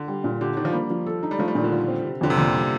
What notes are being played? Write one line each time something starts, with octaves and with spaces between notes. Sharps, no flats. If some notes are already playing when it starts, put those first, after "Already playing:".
Already playing: D3
G3
A#2
D3 G4
D#3 D4
F3
G3 A#3
F3
A4
D#4
G3
F3 A3
G3
A#2 D#3
D3
F4
C4
C3
F2 D3
C3
F2 A#2
G3